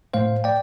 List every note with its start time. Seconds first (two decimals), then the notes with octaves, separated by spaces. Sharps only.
0.14 A2 A3 C5 F5
0.44 D5 G5